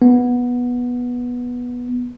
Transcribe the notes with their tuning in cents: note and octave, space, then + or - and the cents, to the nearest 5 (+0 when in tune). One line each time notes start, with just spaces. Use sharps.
B3 -10